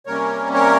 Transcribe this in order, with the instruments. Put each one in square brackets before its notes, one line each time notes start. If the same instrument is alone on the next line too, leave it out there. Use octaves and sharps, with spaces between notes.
[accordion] C3 G3 A#3 C#4 A#4 C#5
A#4 C#5